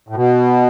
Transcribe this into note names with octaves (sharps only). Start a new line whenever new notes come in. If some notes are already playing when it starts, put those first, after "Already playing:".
A2
B2